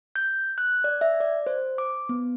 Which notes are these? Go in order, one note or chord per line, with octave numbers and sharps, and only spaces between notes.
G6
F#6
D5
E5
D5
C5
D6
B3